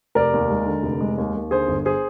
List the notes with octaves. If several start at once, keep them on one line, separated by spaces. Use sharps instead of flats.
F1 A#4 D5
D#2
G#3
D3
F1
G#3
D#2
D#2
D3 G#4 C5
G1
G#4 C5